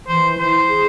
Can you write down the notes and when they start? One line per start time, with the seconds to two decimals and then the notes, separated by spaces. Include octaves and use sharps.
0.08 E3 C5
0.38 E4 C5
0.69 G#4